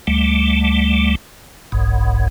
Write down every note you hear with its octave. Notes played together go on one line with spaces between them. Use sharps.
D2 G3 A3
F#1 B1 G#2